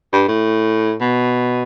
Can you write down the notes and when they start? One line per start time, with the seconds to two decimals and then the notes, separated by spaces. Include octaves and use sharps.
0.13 G2
0.28 A2
1.01 B2